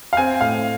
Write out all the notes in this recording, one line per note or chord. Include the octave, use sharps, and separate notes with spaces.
F5
C4 G#5
A2 F5